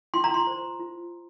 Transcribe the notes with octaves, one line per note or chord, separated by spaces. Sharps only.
F4 C6
A#5
C6
C5
F4